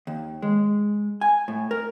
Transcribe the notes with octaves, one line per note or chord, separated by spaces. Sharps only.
D#2
G#3
G#5
A2
A#4